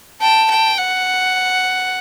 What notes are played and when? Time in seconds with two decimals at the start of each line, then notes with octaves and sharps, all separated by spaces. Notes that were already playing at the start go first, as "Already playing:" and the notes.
0.21 G5 A5
0.50 G5
0.78 F#5